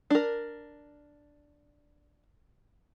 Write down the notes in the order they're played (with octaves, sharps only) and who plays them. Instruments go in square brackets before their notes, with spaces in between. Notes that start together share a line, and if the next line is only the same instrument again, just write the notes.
[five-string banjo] D4 A#4